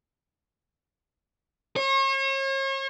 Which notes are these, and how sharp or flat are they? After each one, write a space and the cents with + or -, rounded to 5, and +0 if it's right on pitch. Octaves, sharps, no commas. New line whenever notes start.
C#5 -40